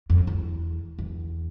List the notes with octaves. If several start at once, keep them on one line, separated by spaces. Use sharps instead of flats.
F2
E2
E2